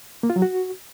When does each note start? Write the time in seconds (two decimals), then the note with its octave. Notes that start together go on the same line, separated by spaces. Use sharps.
0.23 A#3
0.30 F4
0.36 F#3
0.42 F#4